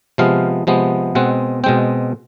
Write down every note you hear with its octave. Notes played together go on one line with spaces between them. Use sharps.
C3 F3 G#3 B3 F5
C3 F3 G#3 B3
B2 G#3 C4 F#5
B2 G#3 C4 G5